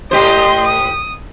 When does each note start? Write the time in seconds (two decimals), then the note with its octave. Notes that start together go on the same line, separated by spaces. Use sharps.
0.11 A2 G4 C5 D#5 C6
0.67 D#6